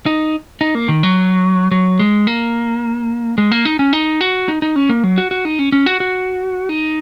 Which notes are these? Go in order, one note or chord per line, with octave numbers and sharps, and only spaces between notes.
D#4
D#4
A#3
D#3
F#3
F#3
G#3
A#3
G#3
A#3
D#4
C#4
D#4
F#4
D#4
D#4
C#4
A#3
F#3
F#4
F#4
D#4
C#4
C#4
F#4
F#4
D#4